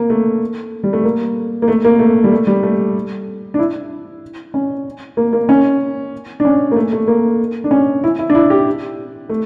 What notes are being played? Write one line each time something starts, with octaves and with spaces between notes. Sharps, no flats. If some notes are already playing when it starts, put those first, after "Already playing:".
Already playing: A#3
A3
G3
A3
A#3
A#3
A3
A#3
A3
G3
A3
G3
A3
D4
E4
C#4
A#3
A#3
C#4
D4
C#4
A#3
A3
A3
A#3
D4
C#4
E4
E4
D4
E4
G4
A3